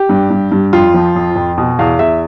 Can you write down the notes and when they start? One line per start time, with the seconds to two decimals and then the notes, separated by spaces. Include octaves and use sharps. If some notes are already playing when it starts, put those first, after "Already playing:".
Already playing: G4
0.09 G2
0.30 G2
0.52 G2
0.73 F2 F4
0.94 F3
1.16 F2
1.36 F2
1.58 B2
1.79 E2 F5
1.99 E2 E5